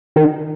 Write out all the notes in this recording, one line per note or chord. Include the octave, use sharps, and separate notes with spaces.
D#3